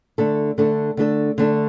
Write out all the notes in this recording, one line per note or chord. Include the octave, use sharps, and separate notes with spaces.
D3 A3 D4 A4
D3 A3 D4 A4
D3 A3 D4 A4
D3 A3 D4 A4